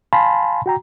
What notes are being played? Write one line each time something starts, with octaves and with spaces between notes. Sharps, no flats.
F5 G#5 A5 B5 C6
F#4 G5 A#5